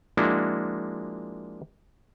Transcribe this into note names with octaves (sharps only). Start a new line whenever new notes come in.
F3 G#3 A#3 D4 E4 F#4